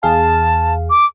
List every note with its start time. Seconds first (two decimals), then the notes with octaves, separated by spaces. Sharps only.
0.03 E2 G#4 F5 A5
0.90 D6